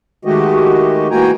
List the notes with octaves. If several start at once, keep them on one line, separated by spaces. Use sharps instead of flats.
D#3 G#3 A3 F#4 G4 D#5
E3 A#3 F#4 G5 G#5 A#5